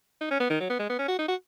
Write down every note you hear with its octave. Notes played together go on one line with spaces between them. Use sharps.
D#4
C#4
B3
D#3
F#3
B3
G#3
B3
C#4
F#4
D#4
F#4